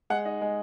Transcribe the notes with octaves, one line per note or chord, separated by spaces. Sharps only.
G#3 F#5
D#4
G#3